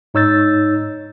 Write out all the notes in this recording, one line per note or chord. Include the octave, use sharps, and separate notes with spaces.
G#2 D#4 C#5 E6 G6 A6